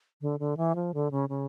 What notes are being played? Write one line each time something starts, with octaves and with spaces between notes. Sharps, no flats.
D3
D3
E3
F3
D3
C#3
C#3